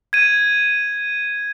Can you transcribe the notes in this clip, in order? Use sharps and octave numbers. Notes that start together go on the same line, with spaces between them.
G#6 D#7